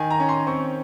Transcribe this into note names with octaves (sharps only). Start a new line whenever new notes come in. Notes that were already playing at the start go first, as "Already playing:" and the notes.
Already playing: D#3 G#5
A#5
C#4
C6
C4 C#6